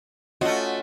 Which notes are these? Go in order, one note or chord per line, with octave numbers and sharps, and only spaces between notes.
A3 C#4 F4 F#4 D#5